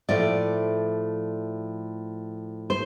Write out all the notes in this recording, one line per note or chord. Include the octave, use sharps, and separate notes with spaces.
A2 F3 A3 D5
C5